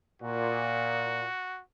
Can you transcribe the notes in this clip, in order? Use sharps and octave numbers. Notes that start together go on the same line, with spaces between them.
A#2 F#4